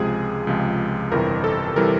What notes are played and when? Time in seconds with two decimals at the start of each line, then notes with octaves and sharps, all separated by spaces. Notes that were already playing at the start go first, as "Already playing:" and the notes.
Already playing: C#2 C3 F3 G#3 G#4
0.47 C#2 C3 F3 G#3
1.12 G1 F2 C3 E3 G3 A#4
1.44 A4
1.76 C3 E3 G3 A#4